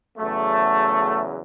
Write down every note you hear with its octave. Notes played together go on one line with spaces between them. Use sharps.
E2 C#3 F#3 A3